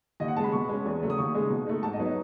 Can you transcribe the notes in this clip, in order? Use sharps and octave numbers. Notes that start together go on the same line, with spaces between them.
D#2 D#5
F#5
C#3 G#3 A5 B5
B2 C#6
G#3 C#4
E2
C#3 F#3 A3
D#6
D#2 C#6
C#3 G#3 D#4
B2
A3 D#4
G#2 A5
D#5
F#3 B3 D#4
D#5